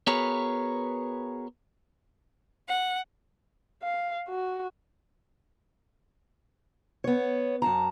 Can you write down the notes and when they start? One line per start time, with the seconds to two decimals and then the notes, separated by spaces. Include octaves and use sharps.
0.07 B3 F#4 G#4 A#4 B4 C#5
2.68 F#5
3.83 F5
4.29 F#4
7.04 B3 C#5
7.62 F#2 A5 A#5